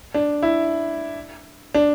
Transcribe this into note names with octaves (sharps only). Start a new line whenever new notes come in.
D4
E4
D4